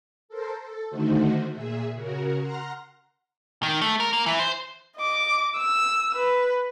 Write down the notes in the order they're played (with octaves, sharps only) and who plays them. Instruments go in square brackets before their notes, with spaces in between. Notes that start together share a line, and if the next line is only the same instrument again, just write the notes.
[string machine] A4 A#4 C5
A4
D3 D#3 A3 D#4 F#4 C5
A#2 G#4 E5
C#3 F#4 A#4
F#5 A#5 C6 F6 A#6
[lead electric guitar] D#3
A3
A#4
A#3
E3
C5
[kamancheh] D#5 D6
E6
B4